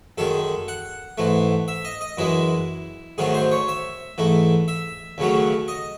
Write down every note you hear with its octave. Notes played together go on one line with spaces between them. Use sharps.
F#2 D#3 G#3 A4
F#5
G#2 E3 A3
E5
D#5
D#5
F#2 E3 G#3 E4
G#2 D#3 F#3 A3 G#4
C5
C#5
E5
G#2 E3 A3
E5
D#2 C#3 F#3 A3
D#5